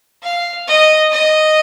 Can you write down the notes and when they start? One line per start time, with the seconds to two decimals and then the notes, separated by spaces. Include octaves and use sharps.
0.23 F5
0.67 D#5
1.12 D#5